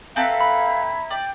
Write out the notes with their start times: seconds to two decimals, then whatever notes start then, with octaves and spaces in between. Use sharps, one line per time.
0.16 C4 A4 B4 E5 F5 A#5 G#6
0.41 B5
1.10 D5 G5